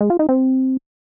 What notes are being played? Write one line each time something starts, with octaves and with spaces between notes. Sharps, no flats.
G#3
F4
D#4
C4